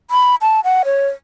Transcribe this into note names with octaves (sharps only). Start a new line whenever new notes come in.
B5
A5
F#5
C#5